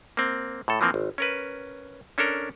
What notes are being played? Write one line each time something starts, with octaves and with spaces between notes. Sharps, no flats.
A#3 C4
A2 A4
E3 F3 A#3 C4
G#1
C#4 A#4 B4
C#4 D4 A4 A#4